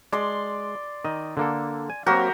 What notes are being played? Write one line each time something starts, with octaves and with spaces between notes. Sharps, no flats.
G#3 D5 C6
D#3 D#5
D3 A#3 A4
G#5
F#3 A#3 C4 F#4 G4 A#4